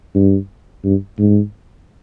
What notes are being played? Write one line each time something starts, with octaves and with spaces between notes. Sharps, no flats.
G2
G2
G#2